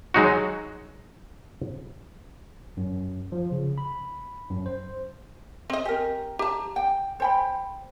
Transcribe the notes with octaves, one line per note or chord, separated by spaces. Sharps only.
F#3 G#3 D#4 F#4
F#2
F3
C#3
B5
F#2
C5
C4 D#5
G4 A#4
G4 A5 A#5
G5
C5 G5 B5